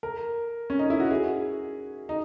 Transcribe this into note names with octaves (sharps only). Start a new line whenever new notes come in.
A#4
C#4
D#4
E4
F#4
G#4
D#4